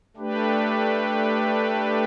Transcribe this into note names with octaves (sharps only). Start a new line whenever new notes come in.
A3 D4 G4 B4